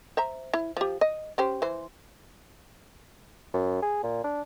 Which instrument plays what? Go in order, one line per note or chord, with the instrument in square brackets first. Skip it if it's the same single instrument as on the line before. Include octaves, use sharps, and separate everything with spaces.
[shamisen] C5 E5 A#5
E4
F3 G4
D#5
C#4 G4 C5
E3 C5
[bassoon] F#2
G#4
A#2
D4